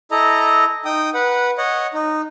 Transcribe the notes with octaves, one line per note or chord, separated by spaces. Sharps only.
E4 A4 D#5 A#5
D#4 G5 D#6
B4 F#5
C#5 D#5 F#5
D#4